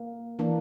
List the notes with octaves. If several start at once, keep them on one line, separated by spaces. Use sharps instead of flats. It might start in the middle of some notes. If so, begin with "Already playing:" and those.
Already playing: A#3
E3 A#3 D4